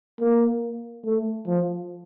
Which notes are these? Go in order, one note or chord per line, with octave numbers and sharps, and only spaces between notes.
A#3
A3
F3